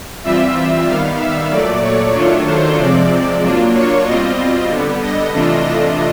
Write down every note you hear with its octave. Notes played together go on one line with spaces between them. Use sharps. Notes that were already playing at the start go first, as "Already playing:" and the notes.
E3 G3 C4 F4 E5
D#3 G3 B3 F5
E5
A#2 F#3 A3 D5
C#5
D#3 F#3 A3 D4 F4
C5
C3 F3 G#3 C4 D5
F#3 A#3 D4 F4
C#5
B2 G3 C4 F4 D#5
D3 G3 B3
D#5
C3 E3 A3 D4 F4
D#5